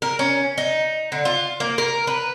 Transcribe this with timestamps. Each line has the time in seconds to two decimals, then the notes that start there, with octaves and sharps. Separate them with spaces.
0.02 A#4
0.19 C#4
0.58 D#4
1.12 D3
1.25 F4
1.60 A#3
1.78 A#4
2.07 B4